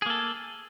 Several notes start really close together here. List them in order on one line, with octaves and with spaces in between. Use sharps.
G#4 A#3 A4